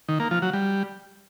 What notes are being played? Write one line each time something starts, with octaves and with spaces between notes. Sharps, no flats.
D#3
A#3
F3
F#3
G3